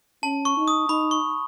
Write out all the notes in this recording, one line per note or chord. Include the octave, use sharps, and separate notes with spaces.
C#4 A5
C#6
D#4
D#6
D#4 B5
C#6